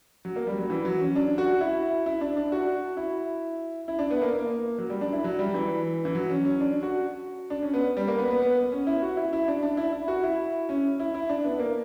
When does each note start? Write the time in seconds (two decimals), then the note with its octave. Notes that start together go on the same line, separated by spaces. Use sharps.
0.25 F#3
0.36 A#3
0.47 G3
0.59 F#3
0.70 E3
0.85 F#3
1.00 C#4
1.16 D4
1.38 F#4
1.61 E4
2.06 E4
2.21 D4
2.37 D4
2.52 F#4
2.97 E4
3.88 E4
3.99 D4
4.11 B3
4.22 A#3
4.33 A#3
4.78 F#3
4.90 G3
5.01 D4
5.13 E4
5.24 F#3
5.39 G3
5.54 E3
6.05 E3
6.15 F#3
6.30 C#4
6.45 C#4
6.61 D4
6.83 F#4
7.50 D4
7.63 C#4
7.74 B3
7.97 G3
8.08 A#3
8.19 B3
8.31 B3
8.42 B3
8.72 C#4
8.87 E4
9.02 F#4
9.17 E4
9.33 E4
9.48 D4
9.63 D4
9.77 E4
9.93 E4
10.08 F#4
10.23 E4
10.69 C#4
11.00 E4
11.14 E4
11.29 D4
11.44 B3
11.59 A#3